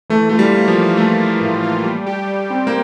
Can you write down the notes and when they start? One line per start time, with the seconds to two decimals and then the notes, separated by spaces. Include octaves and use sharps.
0.10 E3 A3
0.29 A3 F4
0.39 G3
0.54 A#3
0.68 F3
0.75 A#3
0.97 A3 A#3
1.19 F4
1.41 A2
1.63 F4
1.84 G3
2.06 G4
2.27 G3
2.50 C4
2.67 A#3